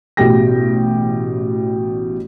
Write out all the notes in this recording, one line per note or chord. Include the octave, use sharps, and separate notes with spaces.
A1 B2 G4 G5 A#6